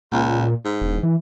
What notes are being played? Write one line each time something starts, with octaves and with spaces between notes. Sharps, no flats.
C#2 A#2
G#2
E1
E3